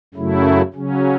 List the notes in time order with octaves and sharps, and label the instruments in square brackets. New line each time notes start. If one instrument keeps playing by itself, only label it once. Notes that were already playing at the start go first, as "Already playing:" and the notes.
[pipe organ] F#2 C#3 F#3 A3 E4
C#3 F#3 C#4